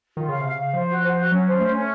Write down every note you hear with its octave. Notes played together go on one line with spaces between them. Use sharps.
D#3 F4
C#3 F5
C3 F5
C#3
F5
F3 C5
F#4
C5
F#4
F#3 C#4
C5
A3 C#4
C#4